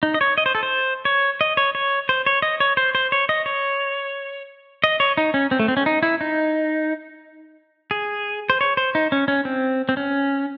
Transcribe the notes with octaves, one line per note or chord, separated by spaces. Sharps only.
D#4
D#5
C#5
D#5
C5
A4
C5
C#5
D#5
C#5
C#5
C5
C#5
D#5
C#5
C5
C5
C#5
D#5
C#5
D#5
C#5
D#4
C#4
C4
A3
C4
C#4
D#4
E4
D#4
G#4
C5
C#5
C5
D#4
C#4
C#4
C4
C4
C#4